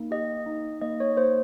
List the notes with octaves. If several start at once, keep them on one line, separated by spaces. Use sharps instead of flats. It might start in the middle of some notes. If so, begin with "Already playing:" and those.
Already playing: A#3 D#4
G4 D#5
D#4
A#3 D#5
C#5
A#3 C5